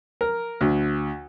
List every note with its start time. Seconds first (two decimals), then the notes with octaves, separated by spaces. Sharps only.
0.21 A#4
0.61 D2